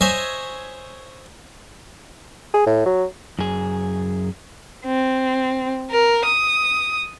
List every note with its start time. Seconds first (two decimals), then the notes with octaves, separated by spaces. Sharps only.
0.01 C5 C#5 D#5 E5 G#5
2.54 G#4
2.66 A2
2.86 F#3
3.39 F#2 G#4
4.85 C4
5.91 A#4
6.25 D#6